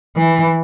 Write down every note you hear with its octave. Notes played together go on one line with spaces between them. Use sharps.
E3